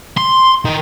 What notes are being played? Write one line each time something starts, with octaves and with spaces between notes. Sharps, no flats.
C6
D#3